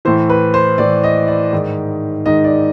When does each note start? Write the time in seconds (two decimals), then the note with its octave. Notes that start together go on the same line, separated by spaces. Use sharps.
0.05 A2 E3 C5
0.29 B4
0.54 C5
0.78 A2 E3 D5
1.04 D#5
1.28 D5
1.53 G#2 D#3
2.26 G#2 D#3 D#5
2.44 D5